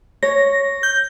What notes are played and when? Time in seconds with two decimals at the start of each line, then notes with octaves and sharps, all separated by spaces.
0.23 C#5 A#6
0.83 G6